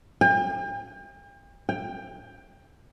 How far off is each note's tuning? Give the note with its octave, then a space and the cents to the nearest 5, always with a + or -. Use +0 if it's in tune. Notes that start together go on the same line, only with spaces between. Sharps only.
G5 +40
G5 +15